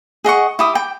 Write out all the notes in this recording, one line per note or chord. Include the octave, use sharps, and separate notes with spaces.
G#4 D#5 F#5 C#6
E4 G4 D#6
G5 D6